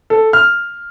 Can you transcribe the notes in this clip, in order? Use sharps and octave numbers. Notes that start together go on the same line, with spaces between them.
A4
F6